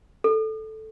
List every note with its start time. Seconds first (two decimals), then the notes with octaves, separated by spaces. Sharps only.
0.24 A4